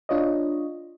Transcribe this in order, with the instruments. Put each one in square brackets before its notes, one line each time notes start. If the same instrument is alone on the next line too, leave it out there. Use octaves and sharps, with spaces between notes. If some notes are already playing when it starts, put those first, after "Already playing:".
[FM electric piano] D4 F4 C#5 D#5